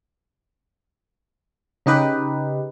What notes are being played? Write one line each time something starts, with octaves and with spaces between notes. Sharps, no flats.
C#3 D#4 G4 B4